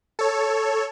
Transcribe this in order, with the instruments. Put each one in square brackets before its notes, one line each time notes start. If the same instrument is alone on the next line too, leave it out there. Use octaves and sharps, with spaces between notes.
[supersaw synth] A4 C#5